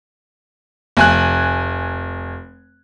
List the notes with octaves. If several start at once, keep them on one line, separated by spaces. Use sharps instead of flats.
F1 G#5 F#6